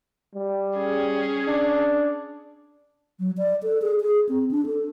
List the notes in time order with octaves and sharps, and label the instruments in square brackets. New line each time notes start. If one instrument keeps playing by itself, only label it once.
[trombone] G3
[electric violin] C#4 G#4
[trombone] D4
[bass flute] F#3
D5
A4
G#4
G#4
C4
D4
A4